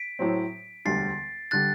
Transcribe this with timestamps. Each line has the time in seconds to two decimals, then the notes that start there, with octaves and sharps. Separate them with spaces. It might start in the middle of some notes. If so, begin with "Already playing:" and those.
Already playing: B6 D7
0.19 A2 F#3 C4
0.85 E1 D2 D3 G3 A6 C7
1.51 D3 G3 F#6 A6